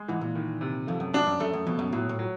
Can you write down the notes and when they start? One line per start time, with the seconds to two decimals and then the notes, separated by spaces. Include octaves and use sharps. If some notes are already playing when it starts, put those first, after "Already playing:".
Already playing: G#3
0.08 G#2 E3
0.21 A#2
0.35 D#3
0.61 C3
0.87 F2 A3
1.00 F#2
1.14 F#2 D4
1.27 F#2
1.40 F#2 A3
1.53 F#2
1.67 F2 B2
1.79 F#2
1.92 A2 F#3
2.09 A2
2.19 F#3